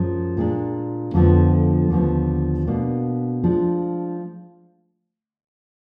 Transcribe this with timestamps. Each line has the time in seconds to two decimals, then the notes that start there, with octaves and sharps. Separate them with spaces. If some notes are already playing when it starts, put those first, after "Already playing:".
Already playing: F#2 F3 G#3
0.37 A#2 G#3 D4
1.13 F2 D3 F3 B3
1.90 D#2 D3 F3 B3
2.67 B2 A#3 D4
3.43 F3 G#3 D4